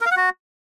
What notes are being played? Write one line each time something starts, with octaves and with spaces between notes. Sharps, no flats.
A#4
F5
F#5
F#4